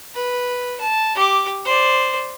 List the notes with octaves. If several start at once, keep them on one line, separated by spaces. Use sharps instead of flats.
B4
A5
G4 D6
C5 D5